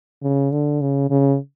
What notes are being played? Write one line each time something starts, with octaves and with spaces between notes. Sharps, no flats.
C#3
D3
C#3
C#3